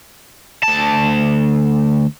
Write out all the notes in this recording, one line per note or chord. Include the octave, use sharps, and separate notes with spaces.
D2 A5